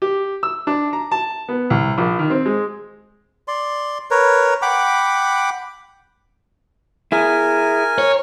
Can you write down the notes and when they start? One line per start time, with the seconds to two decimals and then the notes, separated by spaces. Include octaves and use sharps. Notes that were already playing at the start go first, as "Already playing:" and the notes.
0.02 G4
0.43 E6
0.67 D4
0.93 A#5
1.12 A5
1.49 B3
1.70 C2
1.98 A#1
2.19 D#3
2.30 C4
2.46 G#3
3.48 D5 C6
4.11 A#4 B4 C#5
4.62 F#5 G5 B5 D6
7.12 E4 G#4 A#4 G#5
7.98 C#5